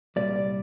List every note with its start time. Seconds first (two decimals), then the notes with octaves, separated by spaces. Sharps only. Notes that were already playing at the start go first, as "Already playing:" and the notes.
0.16 C2 A#2 G3 D5
0.36 D5